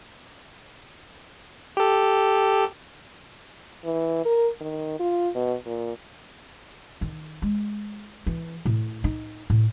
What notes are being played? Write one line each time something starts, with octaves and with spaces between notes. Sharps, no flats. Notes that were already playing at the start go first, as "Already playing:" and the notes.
G4 A4
E3
A#4
D#3
F4
B2
A#2
D#3
G#3
E3
A2
D#4
A2